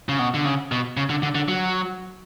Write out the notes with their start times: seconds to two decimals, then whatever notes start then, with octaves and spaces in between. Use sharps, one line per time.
0.09 C#3
0.19 B2
0.34 D3
0.45 C#3
0.72 B2
0.97 C#3
1.10 D3
1.23 D3
1.35 D3
1.48 F#3